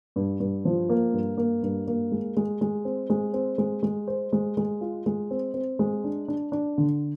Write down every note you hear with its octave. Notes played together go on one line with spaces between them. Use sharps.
G2
G2
F3
A#3
G2
A#3
G2
A#3
G#3
G#3
G#3
C4
G#3
C4
G#3
G#3
C5
G#3
G#3
F4
G#3
C4
C4
G#3
D4
D4
D4
D3